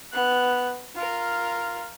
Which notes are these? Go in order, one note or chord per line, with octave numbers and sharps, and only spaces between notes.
B3 F#6
F4 A#4